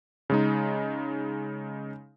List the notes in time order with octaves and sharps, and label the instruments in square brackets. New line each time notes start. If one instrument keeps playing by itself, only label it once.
[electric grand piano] C#3 G#3 D#4